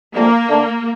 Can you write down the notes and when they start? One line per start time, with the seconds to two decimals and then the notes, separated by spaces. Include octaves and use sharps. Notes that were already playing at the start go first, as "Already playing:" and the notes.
0.14 F2 D3 F3 A3 A#3 D4
0.48 D3 A3 D4